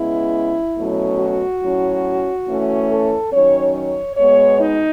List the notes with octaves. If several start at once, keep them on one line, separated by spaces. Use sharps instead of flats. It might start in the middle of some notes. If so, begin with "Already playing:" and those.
Already playing: C#3 G#3 B3 E4
B2 F#3 A3 C#4
F#4
A2 F#3 C#4
E3 A3 C#4
A4
D#3 F#3 C#4 C#5
C#5
B2 G#3 B3 C#5
D#4